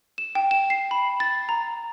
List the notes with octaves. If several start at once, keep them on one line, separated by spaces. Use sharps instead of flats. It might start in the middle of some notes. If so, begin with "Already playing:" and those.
E7
G5
E7
C7
B5
A6
A#5